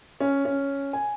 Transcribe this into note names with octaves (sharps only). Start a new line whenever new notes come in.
C#4
C#4
G#5